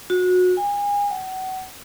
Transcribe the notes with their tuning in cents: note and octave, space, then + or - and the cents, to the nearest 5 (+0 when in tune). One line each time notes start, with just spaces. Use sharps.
F#4 -25
G#5 -35
F#5 +30